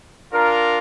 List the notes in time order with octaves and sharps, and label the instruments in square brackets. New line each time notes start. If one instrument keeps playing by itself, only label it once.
[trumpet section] D4 F4 A#4